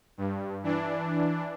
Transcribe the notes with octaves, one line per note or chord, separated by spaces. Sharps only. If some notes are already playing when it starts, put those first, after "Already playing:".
G2
E3 D4